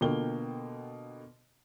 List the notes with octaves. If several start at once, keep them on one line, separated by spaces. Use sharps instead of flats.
B2 D3 A#3 F4 G5 G7